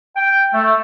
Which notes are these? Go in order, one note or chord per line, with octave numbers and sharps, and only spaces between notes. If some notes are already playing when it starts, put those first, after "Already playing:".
G5
A3